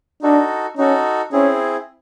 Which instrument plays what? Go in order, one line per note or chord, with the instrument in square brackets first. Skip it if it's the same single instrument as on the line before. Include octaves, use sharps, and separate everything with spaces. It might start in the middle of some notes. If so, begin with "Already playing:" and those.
[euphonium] D4 [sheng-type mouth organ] D#4 F#4 A4
[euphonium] C#4 [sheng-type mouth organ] D#4 F#4 A4
[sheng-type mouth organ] C4 E4 G#4 [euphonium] C#4